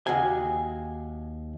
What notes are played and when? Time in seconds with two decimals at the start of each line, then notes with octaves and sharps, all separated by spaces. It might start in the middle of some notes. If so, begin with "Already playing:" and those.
0.07 D#2 F#4 G#4 G#5